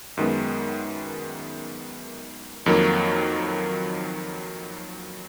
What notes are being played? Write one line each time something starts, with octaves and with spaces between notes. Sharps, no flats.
F#2 D#3 G#3 B3
F2 D#3 F#3 A#3